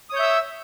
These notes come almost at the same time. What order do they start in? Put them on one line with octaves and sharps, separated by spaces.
D#6 C#5 G6 E5 E6